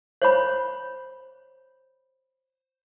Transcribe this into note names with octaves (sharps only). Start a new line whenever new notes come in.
C5 C#5 B5